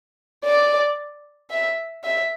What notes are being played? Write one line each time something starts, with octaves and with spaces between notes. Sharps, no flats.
D5
E5
E5